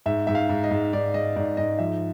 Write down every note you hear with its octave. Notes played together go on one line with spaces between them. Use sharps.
G#2 E5
G#2 E5
F5
G#2
D#5
G#2
G#2 D5
G#2 D#5
G#2 D5
G#2 D#5
F3 E5